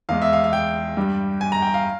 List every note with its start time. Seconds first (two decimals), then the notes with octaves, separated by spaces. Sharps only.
0.09 E2 E3 G#3 F5
0.22 E5
0.33 F5
0.44 F5
0.53 G5
0.97 G2 G3
1.41 G#5
1.52 A#5
1.62 G5
1.74 F5